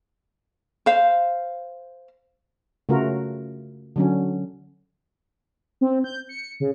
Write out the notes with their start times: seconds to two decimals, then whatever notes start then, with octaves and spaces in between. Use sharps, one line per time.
0.86 C5 F5
2.89 C#3 A3 F4 F#4 A#4
3.96 D3 F#3 C#4
5.81 C4
6.04 G6
6.29 C#7
6.60 C#3